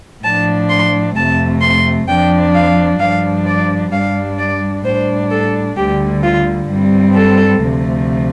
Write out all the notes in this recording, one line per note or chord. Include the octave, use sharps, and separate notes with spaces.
A2 F3 D4 A5
C6
F2 C3 A3 A5
C6
F2 F3 D4 G5
F5
G2 F3 D4 F5
D5
G2 G3 D4 F5
D5
A2 G3 D4 C5
A4
D2 D3 G3 G4
F4
G2 G3 C4
A4
D2 C3 F3 A3